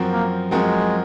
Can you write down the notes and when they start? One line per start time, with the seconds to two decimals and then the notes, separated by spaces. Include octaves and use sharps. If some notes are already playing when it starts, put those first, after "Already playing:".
Already playing: F#2 F3 C4 F#4 A#4
0.12 A#3
0.51 F#2 F3 G#3 C4 F#4 A#4